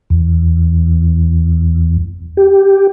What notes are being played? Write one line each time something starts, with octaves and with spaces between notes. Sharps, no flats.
E2
G4